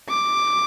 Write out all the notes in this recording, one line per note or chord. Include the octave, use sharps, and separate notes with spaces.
D6